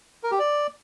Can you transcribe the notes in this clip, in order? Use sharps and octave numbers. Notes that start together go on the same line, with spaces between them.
A#4
G4
D5